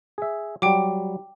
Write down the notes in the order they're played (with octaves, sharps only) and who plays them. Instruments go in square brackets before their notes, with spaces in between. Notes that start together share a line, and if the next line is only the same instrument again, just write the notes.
[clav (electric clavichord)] G#4 E5
[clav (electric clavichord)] F#3 G3 [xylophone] G5 D6